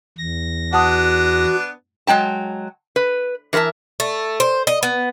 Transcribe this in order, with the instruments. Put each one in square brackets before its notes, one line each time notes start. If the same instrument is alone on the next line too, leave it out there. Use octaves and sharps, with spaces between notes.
[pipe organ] E2 A#6
[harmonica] B3 D4 [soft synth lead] F#4 [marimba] F#5 A5 D#6
[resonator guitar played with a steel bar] F#3 G#3 G5 A5
B4
E3 A#4 B4 E5 A5
[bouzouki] A3
C5
D#5
B3